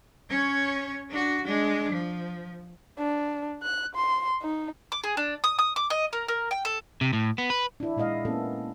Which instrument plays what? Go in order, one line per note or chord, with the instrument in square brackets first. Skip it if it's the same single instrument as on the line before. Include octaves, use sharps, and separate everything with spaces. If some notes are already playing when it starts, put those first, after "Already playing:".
[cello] C#4 C#5
D4 F#4
G#3 D4
F3
[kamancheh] D4
F#6
C6
D#4
[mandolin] D6
G#4
D4
D#6
D#6
D6
D#5
A#4
A#4
G5
A4
[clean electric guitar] C3
A2
B3
B4
[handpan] D4 E4
A#2 G#3 E4 D#5 F5
A#3 B3 C#4 E4 A4